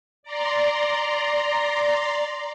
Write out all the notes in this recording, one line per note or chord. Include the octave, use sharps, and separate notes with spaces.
D5 A#5 C6